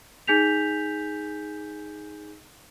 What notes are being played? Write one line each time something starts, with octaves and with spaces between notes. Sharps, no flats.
D#4 G#4 G#5 G6 B6 F7